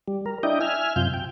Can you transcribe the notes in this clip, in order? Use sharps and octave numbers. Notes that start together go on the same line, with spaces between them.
G3
A#4
D4 E4 D#5 G5
E5 G#5 F6
F#2 C3 F4 G6
G5